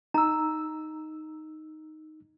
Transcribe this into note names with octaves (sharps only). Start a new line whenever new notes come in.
D#4 A#5 E6